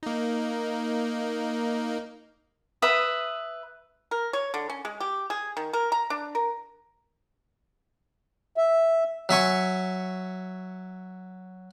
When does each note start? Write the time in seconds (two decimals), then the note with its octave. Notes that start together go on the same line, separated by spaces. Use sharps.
0.03 A#3 D#4
2.82 B4 E5 D#6
4.11 A#4
4.33 C#5
4.54 D3
4.70 C#4
4.85 G#3
5.00 G4
5.30 G#4
5.57 D#3
5.73 A#4
5.92 A#5
6.10 D4
6.35 A#4
8.57 E5
9.29 F#3 E5 G#5 C#6